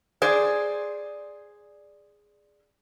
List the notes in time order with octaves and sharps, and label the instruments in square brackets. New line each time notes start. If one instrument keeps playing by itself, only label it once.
[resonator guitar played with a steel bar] G#4 C5 D5